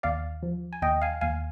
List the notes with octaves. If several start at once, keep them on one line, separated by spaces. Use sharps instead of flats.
D#2 D5 F5
F3
G#5
D#2 D#5 G5
F5 G#5
D#2 F5 G#5